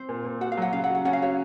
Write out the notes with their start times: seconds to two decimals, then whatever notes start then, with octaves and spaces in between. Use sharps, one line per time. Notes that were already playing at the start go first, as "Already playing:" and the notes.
Already playing: C4 C5
0.09 A#2
0.25 A#2
0.41 F#4 F#5
0.52 F5
0.57 F#3 F#5
0.73 C#3 F5
0.84 F#5
0.89 F#4
0.95 F#5
1.05 C#4 F#5
1.13 F5
1.22 F#4 C#5